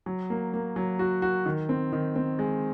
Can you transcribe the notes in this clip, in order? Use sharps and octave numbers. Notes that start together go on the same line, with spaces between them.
F#3
A#3
A#3
F#3
F#4
F#4
D#3
C4
D#3
C4
G#3